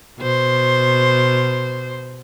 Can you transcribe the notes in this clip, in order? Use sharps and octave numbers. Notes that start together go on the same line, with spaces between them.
B2 C5